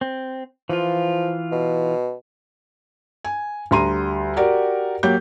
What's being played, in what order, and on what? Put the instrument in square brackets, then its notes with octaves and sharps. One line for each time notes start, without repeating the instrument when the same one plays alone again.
[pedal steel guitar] C4
[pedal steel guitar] E3 F4 [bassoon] F3
[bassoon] B2
[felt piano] G#5
D2 G3 A#5 C6 D#7
F#4 G4 A#4 D5
F#3 A#3 G4 G6